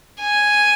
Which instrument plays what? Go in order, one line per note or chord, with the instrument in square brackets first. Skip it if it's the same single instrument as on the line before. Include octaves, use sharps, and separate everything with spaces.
[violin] G#5